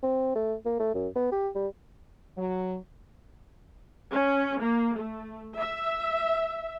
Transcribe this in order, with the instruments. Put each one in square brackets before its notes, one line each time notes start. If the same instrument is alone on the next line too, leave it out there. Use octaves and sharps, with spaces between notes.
[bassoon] C4
A3
A#3
A3
F#2
B3
G4
G3
[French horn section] F#3
[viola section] C#4
A#3
A3
E5